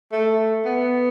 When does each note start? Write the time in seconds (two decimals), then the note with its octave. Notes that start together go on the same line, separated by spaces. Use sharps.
0.12 A3
0.65 B3